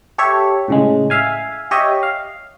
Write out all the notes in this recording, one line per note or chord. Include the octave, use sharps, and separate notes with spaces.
G4 A4 C#5 E5
A2 C#3 G#3
E5 F5 G#5
G4 C#5 D#5 E5
F5